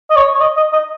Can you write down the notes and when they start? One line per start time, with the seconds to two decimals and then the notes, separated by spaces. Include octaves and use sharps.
0.10 D#5
0.16 C#5
0.34 C#5
0.40 D#5
0.57 D#5
0.73 D#5